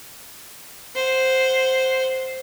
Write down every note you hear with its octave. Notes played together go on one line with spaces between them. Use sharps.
C5 F#5